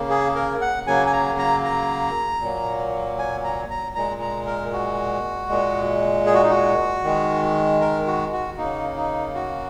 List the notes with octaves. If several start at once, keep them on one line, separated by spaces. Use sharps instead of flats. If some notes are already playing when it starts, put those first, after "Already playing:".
Already playing: C#3 A#3
G#4
A#4
F#5
C#3 F#3 A#3 G#5
G#5
A#5
A#5
A#5
A#2 F#3 A#3
G#5
A#5
A#5
A#2 G#3 A#5
A#5
A#4
F#4
A#2 G#3
G#4
F#4
D#4
F#4
D#3 G#3
A#4
F#4
F#4
C#3 A#3 D#4
D#4
F#4